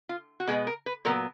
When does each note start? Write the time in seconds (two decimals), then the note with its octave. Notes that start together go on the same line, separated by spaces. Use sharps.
0.09 F4
0.40 F#4
0.47 B2 G#3 B3 G#4
0.67 A#4
0.86 B4
1.05 A#2 F#3 B3 A#4